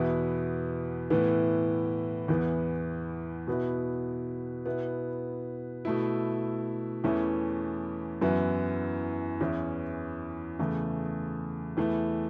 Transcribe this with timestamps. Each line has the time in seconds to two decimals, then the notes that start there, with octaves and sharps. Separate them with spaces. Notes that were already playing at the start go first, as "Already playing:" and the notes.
Already playing: E2 B2 B3 E4
1.10 A2 E3 B3
2.28 E2 E3 B3
3.47 B2 B3 E4
4.66 B2 B3 E4
5.85 B2 A3 E4
7.04 E2 E3 A3 C#4
8.21 F#2 E3 B3 E4
9.41 E2 E3 C#4 E4
10.59 E2 C#3 A3
11.77 E2 E3 A3